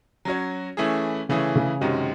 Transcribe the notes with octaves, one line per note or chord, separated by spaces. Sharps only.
F#3 C#4 F#4 C#5
E3 A3 C#4 E4 G#4
C#3 E3 A3 C#4 E4 G#4
C#3
F#2 C3 D#3 G#3 C#4 F#4